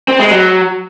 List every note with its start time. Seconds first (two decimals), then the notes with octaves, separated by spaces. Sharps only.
0.08 C4
0.20 G#3
0.31 F#3